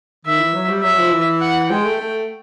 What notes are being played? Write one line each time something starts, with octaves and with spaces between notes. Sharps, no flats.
D#3 E5
E3
F#3
G3
F#3 E5
F#3
F3
E3
F#5
G#3 G5
A3
A3